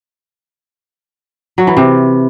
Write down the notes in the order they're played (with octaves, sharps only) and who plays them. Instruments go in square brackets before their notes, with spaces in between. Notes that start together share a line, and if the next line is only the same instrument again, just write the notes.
[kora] F#3
E3
C3